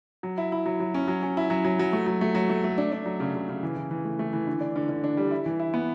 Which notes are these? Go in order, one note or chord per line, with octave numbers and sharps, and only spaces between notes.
F#3
E4
E4
F#3
F#3
C#4
F#3
C#4
E4
F#3
F#3
F#3
A3
F#3
A3
F#3
A3
A3
D4
D4
F#3
C#3
C#3
C#3
E3
E3
E3
A3
A3
E3
D3
D4
D3
D3
D4
G3
E4
E3
E4
B3